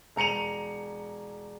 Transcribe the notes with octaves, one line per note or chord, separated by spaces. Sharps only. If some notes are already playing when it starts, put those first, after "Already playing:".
E1 A#5 C#7 D#7 F7